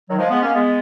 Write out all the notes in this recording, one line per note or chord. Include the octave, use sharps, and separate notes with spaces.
D#3 F#3
F3 G#3
G#3 B3
A#3 C#4
G#3 B3